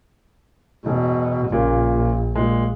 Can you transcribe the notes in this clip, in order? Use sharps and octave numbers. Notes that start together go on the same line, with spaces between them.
E1 B2
A#1 A#2 C#3 A#3
A#2 G#3